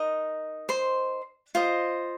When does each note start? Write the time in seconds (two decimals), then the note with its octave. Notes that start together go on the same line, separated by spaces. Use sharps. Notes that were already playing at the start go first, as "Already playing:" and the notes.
Already playing: D#4 A#4 D#5
0.69 C5 C6
1.55 F4 C5 D#5